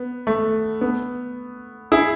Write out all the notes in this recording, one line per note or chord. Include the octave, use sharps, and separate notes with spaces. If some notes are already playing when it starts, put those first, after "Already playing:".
Already playing: B3
A3
B3
E4 G#4